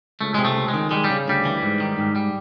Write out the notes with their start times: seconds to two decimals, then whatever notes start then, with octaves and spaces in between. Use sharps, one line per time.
0.21 C#2 A3
0.34 C3 G#3
0.45 A3
0.56 C#2
0.68 G#3
0.74 D#3
0.91 G3 G#3
1.04 G3
1.10 C#3
1.27 D2 G3
1.45 E3
1.62 G#2
1.80 D#3
1.98 G#2
2.16 G3